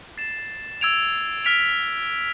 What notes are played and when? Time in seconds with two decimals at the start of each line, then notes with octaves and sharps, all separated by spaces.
0.17 A6 C7 E7
0.81 E6 G#6 D7 F7
1.45 F6 B6 D7 F7